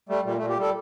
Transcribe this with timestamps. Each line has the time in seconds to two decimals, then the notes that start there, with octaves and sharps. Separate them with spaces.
0.09 G3 A3
0.25 A#2 G3
0.37 A3
0.41 A#2
0.49 G4
0.57 G3 A4